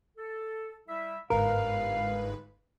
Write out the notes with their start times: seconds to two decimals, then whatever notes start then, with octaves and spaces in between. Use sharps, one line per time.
0.17 A4
0.88 G3 E4 E5
1.30 G1 G#2 A#4 B4 F5